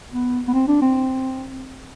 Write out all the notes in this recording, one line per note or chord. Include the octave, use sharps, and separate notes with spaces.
B3
B3
C4
D4
C4